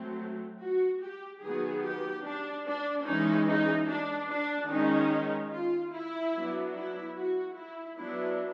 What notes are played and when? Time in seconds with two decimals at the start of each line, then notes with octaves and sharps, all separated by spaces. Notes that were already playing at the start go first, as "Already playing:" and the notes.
Already playing: F#3 A3 C4
0.60 F#4
1.01 G4
1.41 D#3 F#3 B3 G#4
1.82 G4
2.23 D4
2.65 D4
3.05 E3 G#3 C#4 D#4
3.47 D#4
3.87 D4
4.29 D4
4.69 D#3 G#3 C#4 D#4
5.51 F4
5.92 E4
6.34 F#3 B3 D4
6.74 E4
7.16 F#4
7.56 E4
7.98 F#3 B3 D4 E4